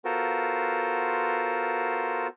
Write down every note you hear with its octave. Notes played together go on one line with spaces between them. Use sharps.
B3 F4 F#4 A4 A#4 C5